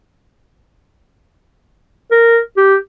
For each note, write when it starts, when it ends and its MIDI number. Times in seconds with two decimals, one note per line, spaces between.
2.11 2.39 70
2.57 2.76 67